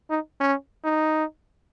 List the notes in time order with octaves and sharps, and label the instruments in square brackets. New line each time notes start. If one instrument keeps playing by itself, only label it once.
[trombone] D#4
C#4
D#4